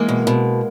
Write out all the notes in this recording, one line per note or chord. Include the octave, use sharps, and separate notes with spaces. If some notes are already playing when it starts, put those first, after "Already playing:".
Already playing: E3 G#3 A#3
B2
B2